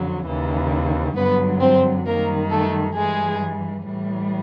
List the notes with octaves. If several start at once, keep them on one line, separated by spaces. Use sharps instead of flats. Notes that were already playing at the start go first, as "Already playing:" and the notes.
Already playing: F2 D3 F#3
D#2 C#3 E3
G2 D3 F#3 B3 B4
C4 C5
F#2 D#3 G3 A#3 A#4
A3 A4
G2 E3 G3 G#3 G#4
A2 E3 G3